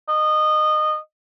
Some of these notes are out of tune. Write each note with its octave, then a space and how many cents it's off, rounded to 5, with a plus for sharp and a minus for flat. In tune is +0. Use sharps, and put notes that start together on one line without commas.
D#5 -20